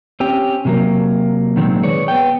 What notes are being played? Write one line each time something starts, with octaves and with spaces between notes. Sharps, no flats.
C4 C#4 G4
C3 F#3 A#3
A#2 D#3 F#3 G#3 A#3 C4
G#4 B4 C#5 D5
B3 G5